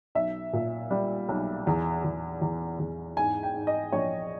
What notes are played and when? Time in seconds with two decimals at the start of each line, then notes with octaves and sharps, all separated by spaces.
0.15 B1 E5
0.53 A#2
0.91 G3
1.29 B1
1.67 E2
2.04 E2
2.42 E2
2.79 E2
3.17 G#2 G#5
3.43 G5
3.55 G#2
3.67 D#5
3.92 A#1 C#5